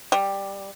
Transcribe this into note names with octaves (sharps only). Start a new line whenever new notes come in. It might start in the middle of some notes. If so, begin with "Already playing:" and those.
G3